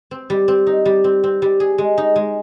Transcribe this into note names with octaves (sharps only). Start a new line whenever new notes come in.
C4
G3
C4
D#4
G3
C4
C4
G3
G#4
G#3
D#4
G#3